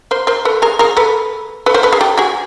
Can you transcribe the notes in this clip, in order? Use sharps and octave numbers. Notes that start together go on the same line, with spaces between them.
A#4 C5
A#4 C5
A4 B4
G#4 A#4
G#4 A#4
A4 B4
A4 B4
A#4 C5
A4 B4
G#4 A#4
G4 A4
F#4 G#4